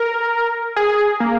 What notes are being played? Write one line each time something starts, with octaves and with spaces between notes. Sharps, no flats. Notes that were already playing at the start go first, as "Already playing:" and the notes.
Already playing: A#4
G#4
A#3